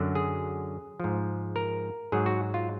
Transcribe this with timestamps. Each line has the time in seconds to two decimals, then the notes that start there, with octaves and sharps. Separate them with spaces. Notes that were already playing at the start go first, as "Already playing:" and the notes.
Already playing: F#2 D3 F#3
0.15 G#4
1.00 G#2 F3
1.56 A#4
2.12 G#2 F#3 G#4
2.26 F#4
2.54 F4